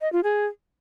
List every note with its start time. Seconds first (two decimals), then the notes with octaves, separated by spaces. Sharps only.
0.01 D#5
0.13 F4
0.24 G#4